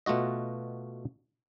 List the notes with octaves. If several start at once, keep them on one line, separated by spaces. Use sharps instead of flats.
B2 A3 F4 F#4 D#5